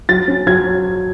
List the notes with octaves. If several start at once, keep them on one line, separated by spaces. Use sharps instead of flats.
F#3 A6
C#4
F#3 G#6